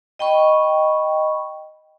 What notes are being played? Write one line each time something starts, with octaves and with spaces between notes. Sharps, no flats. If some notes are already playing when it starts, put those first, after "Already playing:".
D#5 G5 B5 C#6